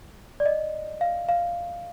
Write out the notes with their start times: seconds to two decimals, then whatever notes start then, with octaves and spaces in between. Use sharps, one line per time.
0.40 D5
0.46 D#5
1.01 F5
1.29 F5